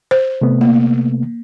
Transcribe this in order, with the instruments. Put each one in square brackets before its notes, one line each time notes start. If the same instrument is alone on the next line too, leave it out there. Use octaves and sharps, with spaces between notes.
[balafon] C5
[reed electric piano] C3 A3 B3
[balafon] A#3